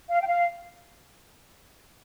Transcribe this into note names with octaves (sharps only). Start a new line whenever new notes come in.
F5
G5
F5